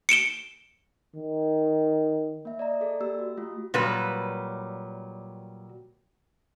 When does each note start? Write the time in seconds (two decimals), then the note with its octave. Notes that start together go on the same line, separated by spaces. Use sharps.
0.09 C#7 D7 E7 G7
1.17 D#3
2.45 A#3 E5
2.59 D5 D#5 A#5
2.81 G#4 A4 D5
3.00 A#3 G4 E6
3.19 F#4
3.37 A3 F4 G4
3.74 A#2 F#3 G3 B4